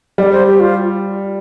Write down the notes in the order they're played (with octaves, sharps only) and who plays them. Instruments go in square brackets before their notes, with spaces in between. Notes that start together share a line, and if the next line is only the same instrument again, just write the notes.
[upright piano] G3 [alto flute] D5
[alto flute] C5
G4
F4